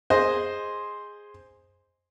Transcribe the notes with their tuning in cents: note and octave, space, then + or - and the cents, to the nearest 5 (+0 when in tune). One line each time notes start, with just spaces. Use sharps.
G#4 -5 C5 +0 D#5 +0